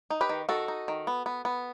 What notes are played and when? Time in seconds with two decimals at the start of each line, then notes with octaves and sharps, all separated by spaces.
0.10 D#4
0.21 G4 B4
0.29 D#3
0.49 D#3 F#4 A4
0.68 D#4
0.88 D#3
1.07 B3
1.26 B3
1.45 B3